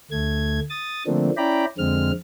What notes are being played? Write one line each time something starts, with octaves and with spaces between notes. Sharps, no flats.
D2 A3 G#6
D#6 A6
D3 F3 A3 A#3 C4 D4
C#4 E4 D5 G5 A#5 B5
F2 D3 G#3 C4 F6